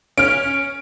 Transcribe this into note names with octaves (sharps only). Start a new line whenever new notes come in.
C#4 F6 D7